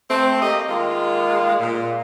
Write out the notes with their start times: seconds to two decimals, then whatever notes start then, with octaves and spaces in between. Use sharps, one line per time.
0.10 A3 C4
0.42 A#3 G4 D#5
0.69 D#3 G#3 A#3 F4
1.60 A#2